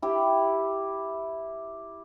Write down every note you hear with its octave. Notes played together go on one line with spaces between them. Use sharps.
E4 G4